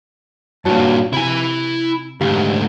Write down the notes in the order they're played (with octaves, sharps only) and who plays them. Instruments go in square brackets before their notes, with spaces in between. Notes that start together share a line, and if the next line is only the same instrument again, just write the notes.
[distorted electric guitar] G2 A#2 [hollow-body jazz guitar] F#4 C#5 A5
[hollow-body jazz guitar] C3 [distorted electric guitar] E4 G#5
[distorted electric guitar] D2 G#2 [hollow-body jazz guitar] G4 F5